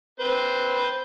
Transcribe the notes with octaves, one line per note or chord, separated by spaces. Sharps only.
C4 B4 C5